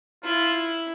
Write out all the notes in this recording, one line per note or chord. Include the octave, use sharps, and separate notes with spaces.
E4 F4